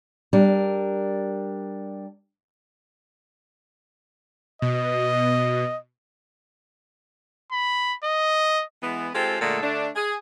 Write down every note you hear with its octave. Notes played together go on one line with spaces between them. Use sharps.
G3 D4 A#4
B2 D#5
B5
D#5
E3 G#3 B3
G#3 C4 F4 G4 A4
A#2 D3 G#3 A3 A4
D3 A3 D4
G#4